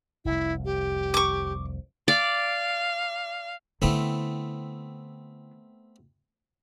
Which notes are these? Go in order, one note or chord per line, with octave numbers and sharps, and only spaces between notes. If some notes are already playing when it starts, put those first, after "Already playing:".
F1 C2 E4
G4
C#6 D6
D5 F5
D3 A3 B3 C4 E4